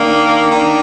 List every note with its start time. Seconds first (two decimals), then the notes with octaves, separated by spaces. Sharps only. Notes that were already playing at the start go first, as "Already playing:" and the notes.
Already playing: D#3 A#3 D4
0.51 D#3 A#3 D4